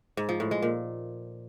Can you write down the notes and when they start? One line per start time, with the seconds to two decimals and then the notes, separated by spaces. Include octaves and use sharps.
0.17 G#2
0.29 F3
0.40 A2
0.51 G#3
0.62 A#2